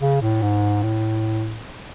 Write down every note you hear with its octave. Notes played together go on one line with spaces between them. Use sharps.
C#3
A2
G#2
A2